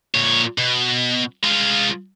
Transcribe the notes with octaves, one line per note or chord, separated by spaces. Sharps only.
A#2 C#5
B2
G#3 F4